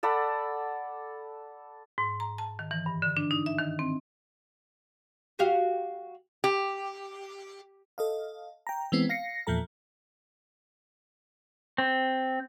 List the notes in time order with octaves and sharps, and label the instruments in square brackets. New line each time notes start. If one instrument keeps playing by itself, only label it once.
[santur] A4 D5 F#5 B5
[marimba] G#2
A#5
A5
D#3
E3
G2
D3
D4
D#4
E5
D#3
C4
[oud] F#4 G4 F5
[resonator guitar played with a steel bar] G4
[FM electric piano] A4 D#5 F5
G5 A#5
E3 G#3 B3 C4
F5 A#6 C7 C#7
E2 A#2 F3 A4 A#5
[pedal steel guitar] C4